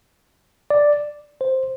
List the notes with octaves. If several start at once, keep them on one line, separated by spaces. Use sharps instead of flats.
D5
C5